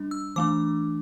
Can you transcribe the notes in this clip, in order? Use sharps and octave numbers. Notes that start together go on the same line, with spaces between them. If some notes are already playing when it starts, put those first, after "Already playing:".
Already playing: G3 D4
E6
E3 A3 D4 D6